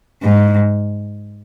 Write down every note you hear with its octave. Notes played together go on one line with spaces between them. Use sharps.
G#2